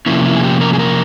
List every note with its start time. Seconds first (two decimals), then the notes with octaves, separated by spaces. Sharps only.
0.06 C3 F3 A#3 C#4 E4
0.25 E4
0.36 G#4
0.43 G4
0.61 A#4
0.73 G#4
0.79 A#4